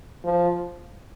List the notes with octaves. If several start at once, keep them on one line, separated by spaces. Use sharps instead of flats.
F3